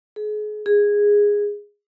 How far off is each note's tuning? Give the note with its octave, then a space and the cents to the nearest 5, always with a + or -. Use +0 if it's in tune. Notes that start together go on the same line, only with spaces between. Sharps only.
G#4 +35
G#4 -10